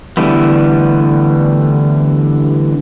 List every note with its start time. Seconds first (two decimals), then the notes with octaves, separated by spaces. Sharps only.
0.17 D3 E3 G3 A3 B3